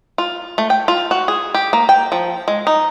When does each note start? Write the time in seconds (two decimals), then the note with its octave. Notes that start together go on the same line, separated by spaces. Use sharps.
0.18 F4
0.58 A3
0.70 G5
0.88 F4
1.11 F#4
1.28 G#4
1.55 G4
1.73 A#3
1.89 G5
2.12 F3
2.48 G#3
2.67 D#4